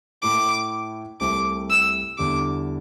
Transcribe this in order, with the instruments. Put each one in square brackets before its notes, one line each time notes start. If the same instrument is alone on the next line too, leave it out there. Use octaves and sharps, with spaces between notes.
[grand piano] A2 A3 E4 [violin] D6
[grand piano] C2 C3 A3 C4 [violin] D6
[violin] E6
[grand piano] E2 D3 G3 [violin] D6